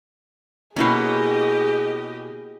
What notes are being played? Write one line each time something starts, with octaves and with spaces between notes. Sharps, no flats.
B2 A#3 C#4 E4 G4 G#4 D#5 F5